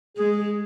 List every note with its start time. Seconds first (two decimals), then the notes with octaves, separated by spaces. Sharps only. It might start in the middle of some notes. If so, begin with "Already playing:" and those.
0.17 G#3 G#4
0.38 G#4